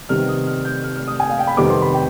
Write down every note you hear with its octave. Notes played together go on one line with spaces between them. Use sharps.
C3 D#3 G3 B3 F6
D#6
F6
G6
F6
F6
D#6
G#5
F5
G5
B5
F2 C3 D#3 G3 B3 D6
C6
B5
G5